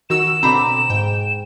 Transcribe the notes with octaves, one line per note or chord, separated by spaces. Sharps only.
D#3 F#4 E6 E7
B2 D3 C4 A#5 B5 D6
G#2 G5